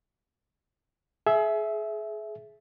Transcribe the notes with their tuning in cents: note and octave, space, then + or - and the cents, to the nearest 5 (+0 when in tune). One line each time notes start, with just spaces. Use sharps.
G#4 +35 E5 +0